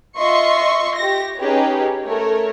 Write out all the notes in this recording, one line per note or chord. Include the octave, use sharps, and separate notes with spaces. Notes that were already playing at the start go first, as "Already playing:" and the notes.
F4 D#5 E5 C6 C#6
G4 A#6
C#4 D#4 G4 G#4 B4 C#5
A3 A#4 C#5